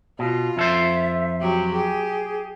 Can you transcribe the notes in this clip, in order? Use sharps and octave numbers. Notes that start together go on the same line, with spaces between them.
B2 F4
F2 A4 C5 E5
F#3 G4
G4 G#4